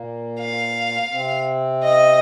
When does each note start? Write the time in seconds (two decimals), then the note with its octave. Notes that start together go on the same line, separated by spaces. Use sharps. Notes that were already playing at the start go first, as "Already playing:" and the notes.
Already playing: A#2 A#3
0.40 F5
1.11 C3 C4
1.83 D#5